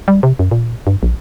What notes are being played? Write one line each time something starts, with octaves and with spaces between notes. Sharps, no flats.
G3
C3
F#2
A#2
G2
A#1